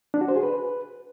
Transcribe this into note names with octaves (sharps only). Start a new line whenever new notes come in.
D4
F#4
C5
G#4
B4